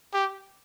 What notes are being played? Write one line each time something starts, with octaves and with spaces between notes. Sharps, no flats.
G4